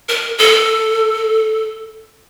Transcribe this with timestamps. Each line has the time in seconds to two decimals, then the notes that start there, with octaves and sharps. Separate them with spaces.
0.09 A#4
0.38 A4